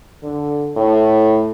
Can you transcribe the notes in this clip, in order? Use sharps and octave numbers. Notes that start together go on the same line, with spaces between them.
D3
A2